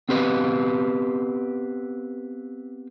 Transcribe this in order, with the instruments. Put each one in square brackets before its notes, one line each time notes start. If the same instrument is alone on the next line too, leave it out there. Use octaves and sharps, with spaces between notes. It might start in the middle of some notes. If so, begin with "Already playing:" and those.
[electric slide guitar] B3 C4 G4 B4 D#5 F5